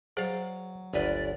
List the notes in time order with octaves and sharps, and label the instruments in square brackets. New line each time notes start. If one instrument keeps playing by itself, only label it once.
[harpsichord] F#3 [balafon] G#4 C5 [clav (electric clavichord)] D5 F5
[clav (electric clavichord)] G1 D2 B4 [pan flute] D5